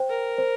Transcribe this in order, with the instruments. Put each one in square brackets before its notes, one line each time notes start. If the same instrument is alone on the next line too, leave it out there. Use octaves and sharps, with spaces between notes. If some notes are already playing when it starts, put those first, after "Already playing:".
Already playing: [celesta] C5 G5
[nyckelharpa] A#4
[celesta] C5